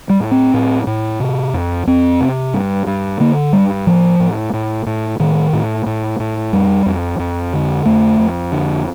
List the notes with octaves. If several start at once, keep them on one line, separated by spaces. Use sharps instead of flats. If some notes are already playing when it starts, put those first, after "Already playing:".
G3
A2
C4
A2
A2
C3
F2
F2 C4
C3
G2
G2
D3 A#3
G2 G3
A2 F3
A2
A2
A2
A2 D#3
A2
A2
A2
F2 G3
F2
F2
D3
F2 A3
F2
D3